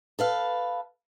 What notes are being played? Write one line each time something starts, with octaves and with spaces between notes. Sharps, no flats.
A4 B4 F5